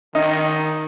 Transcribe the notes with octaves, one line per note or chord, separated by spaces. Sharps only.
D#3 D#4